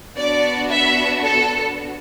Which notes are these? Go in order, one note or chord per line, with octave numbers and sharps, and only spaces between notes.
B3 D4 F#4 D5
E5
A4